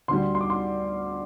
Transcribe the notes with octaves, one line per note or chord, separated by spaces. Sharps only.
D2 D3 G3 C6
C6
D6
C6